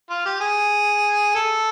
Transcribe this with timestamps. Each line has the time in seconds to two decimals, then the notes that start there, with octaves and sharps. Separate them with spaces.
0.10 F4
0.25 G4
0.40 G#4
1.35 A4